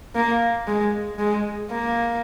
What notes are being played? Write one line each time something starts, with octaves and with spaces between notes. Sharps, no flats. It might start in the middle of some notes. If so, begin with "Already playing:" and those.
A#3
G#3
G#3
A#3